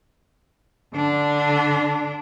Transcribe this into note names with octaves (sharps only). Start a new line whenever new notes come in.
D3 D4